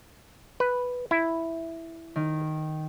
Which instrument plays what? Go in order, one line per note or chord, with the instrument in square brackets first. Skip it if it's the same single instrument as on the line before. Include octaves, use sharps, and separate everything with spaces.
[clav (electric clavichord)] B4
E4
[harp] D#3